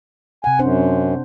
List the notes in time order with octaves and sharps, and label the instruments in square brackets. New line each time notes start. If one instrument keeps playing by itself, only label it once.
[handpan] C3 F#5 [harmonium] G#5
[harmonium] F#2 [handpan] C4 D4 C5